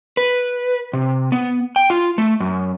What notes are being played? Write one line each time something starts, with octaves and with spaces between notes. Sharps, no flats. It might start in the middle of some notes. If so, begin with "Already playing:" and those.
B4
C3
B3
G5
F4
A3
F#2